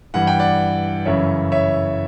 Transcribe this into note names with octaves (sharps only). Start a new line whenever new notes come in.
G2 E3 F#5
G5
D5 F#5
F#2 C#3 E3 C#5 E5
C#5 E5